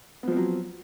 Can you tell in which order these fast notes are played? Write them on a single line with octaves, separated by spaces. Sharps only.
B3 F3 C4 F#3